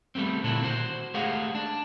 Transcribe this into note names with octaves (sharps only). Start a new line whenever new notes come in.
G3 A3 B3 C4
A#2 D3 C4 D4 E4 A4
F#4 C5
G#3 A3 G4 G#4 F5 F#5
D4